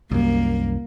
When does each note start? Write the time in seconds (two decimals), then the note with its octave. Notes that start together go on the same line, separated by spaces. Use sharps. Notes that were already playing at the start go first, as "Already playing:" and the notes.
0.12 C2 F#2 A#3